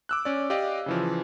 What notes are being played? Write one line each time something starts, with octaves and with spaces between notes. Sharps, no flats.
D6 E6 F#6
C#4 D5
G4 D5 D#5 F5
C#3 E3 F3